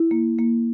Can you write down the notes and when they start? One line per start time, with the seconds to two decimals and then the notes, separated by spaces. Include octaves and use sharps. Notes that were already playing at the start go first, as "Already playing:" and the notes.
Already playing: E4
0.11 A#3
0.38 A#3